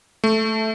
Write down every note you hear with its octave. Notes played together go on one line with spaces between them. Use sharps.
A3